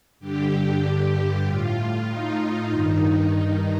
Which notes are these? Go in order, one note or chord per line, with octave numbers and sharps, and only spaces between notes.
G2 D3 G4
A2 F4
D#4
G2 D#3 D#4